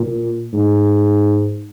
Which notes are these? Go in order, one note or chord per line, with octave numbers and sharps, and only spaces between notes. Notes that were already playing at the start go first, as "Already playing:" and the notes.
Already playing: A#2
G#2